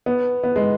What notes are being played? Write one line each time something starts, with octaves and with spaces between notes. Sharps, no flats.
B3
B3
G#3